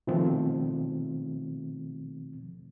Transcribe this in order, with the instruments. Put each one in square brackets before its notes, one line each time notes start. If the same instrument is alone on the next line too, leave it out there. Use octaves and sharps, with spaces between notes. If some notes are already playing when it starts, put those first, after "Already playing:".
[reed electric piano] B2 D#3 F3 A3 C4